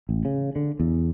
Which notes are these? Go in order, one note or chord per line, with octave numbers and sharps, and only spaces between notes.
A1
C#3
D3
E2